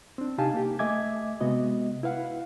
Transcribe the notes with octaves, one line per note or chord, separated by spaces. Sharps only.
C4 D4
C3 D#4 G4 F5 G#5 A5
A#3 G4
A3 D#5 E5 G#5 D6 G#6
C3 G#3 B3 F#4 D#5
E4 B4 F5 F#5